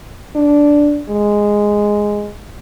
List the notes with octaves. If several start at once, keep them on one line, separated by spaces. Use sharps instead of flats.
D4
G#3